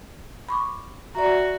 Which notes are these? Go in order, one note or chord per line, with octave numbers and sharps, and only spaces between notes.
B5 C#6 D6
F#4 D5 E5 A#5